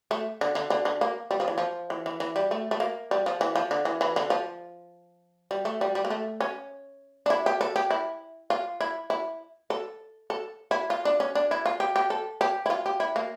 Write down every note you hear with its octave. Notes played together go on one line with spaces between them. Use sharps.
A3
D3
D3
D3
D3
A#3
G3
F3
E3
F3
E3
E3
E3
G3
A3
A3
A#3
G3
F3
E3
F3
D3
E3
E3
D3
F3
G3
A3
G3
G3
A#3
A3
C#4
D4
E4
G4
A4
G4
E4
F4
E4
E4
A4
A4
E4
F4
D4
C#4
D4
E4
F4
G4
G4
A4
G4
E4
F4
G4
E4
A#3